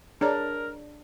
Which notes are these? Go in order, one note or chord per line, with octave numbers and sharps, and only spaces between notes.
D4 G#4 A#4 C#5 A#5